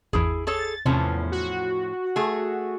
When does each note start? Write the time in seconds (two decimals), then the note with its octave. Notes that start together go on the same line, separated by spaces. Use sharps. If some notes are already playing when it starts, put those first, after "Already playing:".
0.13 G#1 E2 E4 G#4
0.47 G#4 A4 C#5 A6
0.86 E2 A2 C3 F3 C#4 F6
1.32 F#4
2.16 A3 G#4